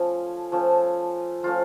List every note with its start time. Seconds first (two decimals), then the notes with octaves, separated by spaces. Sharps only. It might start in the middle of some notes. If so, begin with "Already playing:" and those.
Already playing: F3 A3 C#4
0.52 F3 A3 C#4
1.43 F3 A3 C#4 F4